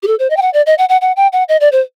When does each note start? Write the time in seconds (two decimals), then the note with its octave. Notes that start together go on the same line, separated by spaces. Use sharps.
0.03 G4
0.07 A4
0.19 C5
0.30 D#5
0.37 G5
0.42 F#5
0.53 D5
0.66 D#5
0.78 F#5
0.89 F#5
1.01 F#5
1.16 G5
1.32 F#5
1.49 D#5
1.60 D5
1.72 C5